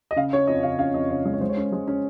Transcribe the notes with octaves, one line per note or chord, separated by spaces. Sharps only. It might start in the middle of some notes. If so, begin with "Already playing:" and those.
D#5
C#3 F5
C#4 C#5
F2 D#5
C#3 F5
C#4 F5
F2 D#5
C#3 C#5
G#3 D#5
C#5
G#3 C5
C#5
C#4
G#3
C#4